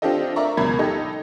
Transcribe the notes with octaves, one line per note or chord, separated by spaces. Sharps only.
C4 D4 F4 G4 A4 D#5
A#4 D5 E5 A#5 C#6
C#2 B2 F#3 A#4 B5 G#6
D#4 G4 A4 D#5